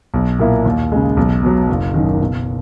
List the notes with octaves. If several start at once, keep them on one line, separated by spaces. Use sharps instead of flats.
B1
A#2 A#3 E4
D#2
C#3 G#3
B1
B2 F#3
F#1
F#2 D#3
B2